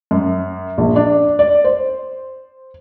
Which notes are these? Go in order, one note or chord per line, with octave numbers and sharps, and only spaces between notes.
F#2
A#1
D4
D5
C5